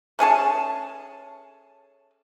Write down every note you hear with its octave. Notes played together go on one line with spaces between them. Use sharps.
A3 C#4 G#4 A5